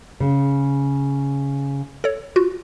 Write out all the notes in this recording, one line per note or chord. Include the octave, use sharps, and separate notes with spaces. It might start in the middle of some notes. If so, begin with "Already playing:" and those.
C#3
A4 C#5
F4 F#4